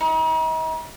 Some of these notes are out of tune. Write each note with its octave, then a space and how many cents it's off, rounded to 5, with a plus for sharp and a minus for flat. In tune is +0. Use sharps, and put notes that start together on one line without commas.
D#4 +40